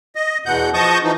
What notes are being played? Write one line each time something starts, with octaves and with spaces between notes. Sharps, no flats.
D#5
E2 B2 F#5 G6
F3 D#5 A5 C#6 D#6 G6
E3 F3 D#4